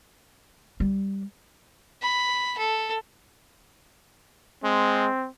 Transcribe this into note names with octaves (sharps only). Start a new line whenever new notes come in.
G3
B5
A4
G#3 C4